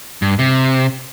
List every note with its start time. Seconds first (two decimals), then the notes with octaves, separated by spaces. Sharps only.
0.22 G2
0.39 C3